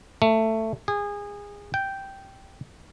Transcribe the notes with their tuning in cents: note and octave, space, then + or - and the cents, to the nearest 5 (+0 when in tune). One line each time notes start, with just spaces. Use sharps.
A3 +15
G#4 -25
G5 -5